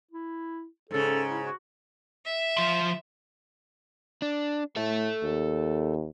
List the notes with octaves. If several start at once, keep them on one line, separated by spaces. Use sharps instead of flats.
E4
G#2 C#3 A4
E4
F#4
E5
F3 C6
D4
A2 A4 E5
D#2